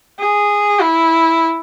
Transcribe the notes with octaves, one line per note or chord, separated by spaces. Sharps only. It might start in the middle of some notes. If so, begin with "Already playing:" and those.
G#4
E4